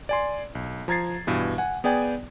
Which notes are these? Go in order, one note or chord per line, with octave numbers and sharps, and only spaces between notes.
D5 G#5 C6
B1
F3 A#5 G#6 A6 C7
G2 B2 E3
F#5 G#5
B3 G#4 D5 G5 G#5